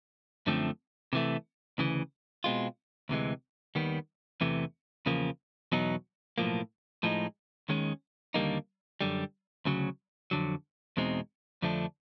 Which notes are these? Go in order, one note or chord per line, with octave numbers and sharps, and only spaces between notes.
F#2 D3 F3 A3 C4
C3 E3 A3
D2 C#3 E3
B2 G#3 C4 F4
D2 C3 E3 G#3
D#2 D#3 G3 B3
E2 C3 E3 A3
E2 C#3 F3 A#3
E2 B2 F#3 B3 D#4
B1 A2 F3 A#3
A2 F3 G#3 C4 D#4
D#2 D#3 G#3 C#4
D#2 D3 G3 A#3 D#4
F#2 D3 G3
D2 C#3 F#3
F2 D3 F#3
E2 B2 G#3 C4 D#4
F2 D3 F3 A3 D4